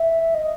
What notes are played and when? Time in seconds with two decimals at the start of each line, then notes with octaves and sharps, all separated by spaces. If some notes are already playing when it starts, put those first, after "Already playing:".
Already playing: E5
0.34 D#5